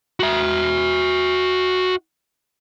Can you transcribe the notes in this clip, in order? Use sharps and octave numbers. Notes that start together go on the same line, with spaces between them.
F#4 E5